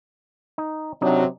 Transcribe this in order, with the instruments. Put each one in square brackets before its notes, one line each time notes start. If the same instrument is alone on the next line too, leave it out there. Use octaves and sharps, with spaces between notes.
[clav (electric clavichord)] D#4
[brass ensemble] C3 F#3 [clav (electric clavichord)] D4 D#4